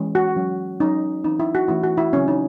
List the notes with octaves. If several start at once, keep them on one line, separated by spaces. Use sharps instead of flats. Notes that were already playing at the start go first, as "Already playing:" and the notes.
Already playing: E3 G#3 C#4
F#4
F#3 C#4
F#3 C#4 D#4
E3 C4 D#4
E4
F#4
E3 A3 C#4 E4
F#4
E4
C#3 F#3 C4 C#4
D#4